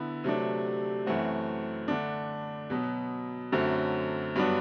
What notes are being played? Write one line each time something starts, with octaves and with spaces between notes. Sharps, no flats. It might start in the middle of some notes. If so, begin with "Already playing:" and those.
Already playing: D3 B3 E4
C3 F#3 A3 D4
F#2 E3 A3 C4 F#4
D3 A3 D4
B2 F#3 B3
F#2 D3 F#3 A3 C4
G2 F#3 B3 D4